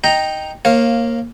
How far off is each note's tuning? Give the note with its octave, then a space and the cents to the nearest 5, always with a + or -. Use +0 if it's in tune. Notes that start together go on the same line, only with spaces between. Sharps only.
D#4 +0 G5 +0 A#5 +0
A#3 +0 C#5 -40 F5 -5